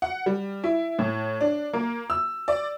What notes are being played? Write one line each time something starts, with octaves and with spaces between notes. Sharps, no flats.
F#5
G3
E4
A2
D4
A#3
E6
D5